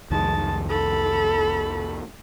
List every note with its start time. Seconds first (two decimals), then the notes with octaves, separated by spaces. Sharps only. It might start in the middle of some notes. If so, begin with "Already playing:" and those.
0.10 C2 F2 D#3 G#3 A5
0.69 A4 B5